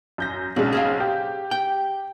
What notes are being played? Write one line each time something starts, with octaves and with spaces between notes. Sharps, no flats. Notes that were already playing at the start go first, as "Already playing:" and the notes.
F#2 G6 A#6
B1 C#3 G#3 D4
G#4 C5 F5
G4
G5